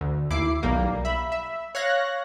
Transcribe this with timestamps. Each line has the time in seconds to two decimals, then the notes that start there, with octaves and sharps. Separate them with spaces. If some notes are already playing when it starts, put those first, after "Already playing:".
0.01 D2
0.30 D#2 E4 D6 C7
0.63 B1 G3 A#3
1.05 E5 B5
1.32 E5
1.75 C#5 F5 F#6 A#6